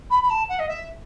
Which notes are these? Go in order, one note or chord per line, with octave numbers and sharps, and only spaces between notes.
B5
B5
A5
F#5
D#5
E5